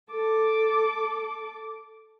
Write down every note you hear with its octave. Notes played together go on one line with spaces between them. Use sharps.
A4 D6